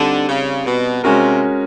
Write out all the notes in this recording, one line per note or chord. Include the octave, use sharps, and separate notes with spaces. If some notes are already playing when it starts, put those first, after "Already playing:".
Already playing: D3 G3 C4 D#4
C#3
B2
C3 G#3 C#4 F#4 A#4